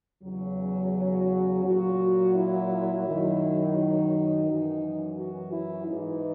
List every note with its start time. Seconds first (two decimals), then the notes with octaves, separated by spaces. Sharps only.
0.24 E2 C#3 F#3
0.94 F#4
1.65 A#2 F#3 F#4
2.35 E4
3.06 F#2 D#3 F#3
3.76 D#4
4.47 F#2 E3
5.17 F#4
5.53 E4
5.88 G#2 E3 D#4